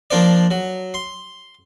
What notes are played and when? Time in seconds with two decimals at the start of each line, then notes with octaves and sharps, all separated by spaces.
0.11 F3 A#3 D4 C5 D5
0.51 F#3
0.94 C6